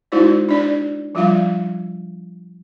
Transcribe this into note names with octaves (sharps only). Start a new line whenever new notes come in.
G#3 D#4 E4 F#4 C5 D5
D4 D5
F3 G3 F4 F5